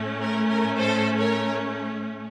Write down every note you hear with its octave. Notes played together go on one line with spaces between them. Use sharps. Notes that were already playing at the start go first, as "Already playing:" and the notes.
Already playing: A2 A3 C#4
A#4
A#4
A4 C5
A#4 C#5